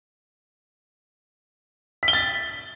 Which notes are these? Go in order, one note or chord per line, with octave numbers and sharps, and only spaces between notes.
B6
G7
A6